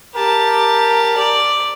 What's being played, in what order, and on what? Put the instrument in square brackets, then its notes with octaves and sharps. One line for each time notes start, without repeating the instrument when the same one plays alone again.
[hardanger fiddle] G4 A5 [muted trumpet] A#4
[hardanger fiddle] D5